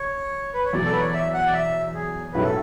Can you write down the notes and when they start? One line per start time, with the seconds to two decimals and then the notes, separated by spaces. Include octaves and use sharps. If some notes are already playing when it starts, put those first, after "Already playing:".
Already playing: C#5
0.54 B4
0.65 C#5
0.73 E2 B2 F#3 D5
0.85 A4
0.92 B4
1.00 C#5
1.07 D5
1.14 E5
1.34 F#5
1.47 D5
1.53 E5
1.94 G#4
2.33 B1 A2 F#3 C#4 E4 B4
2.44 A4